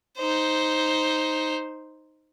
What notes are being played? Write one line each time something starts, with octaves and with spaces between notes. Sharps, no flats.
D#4 C5